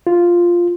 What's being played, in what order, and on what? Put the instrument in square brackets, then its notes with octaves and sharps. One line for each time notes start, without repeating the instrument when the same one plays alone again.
[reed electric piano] F4